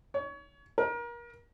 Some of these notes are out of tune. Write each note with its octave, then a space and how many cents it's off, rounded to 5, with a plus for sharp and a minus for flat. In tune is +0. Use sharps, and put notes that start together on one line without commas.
C#5 +25
A#4 +30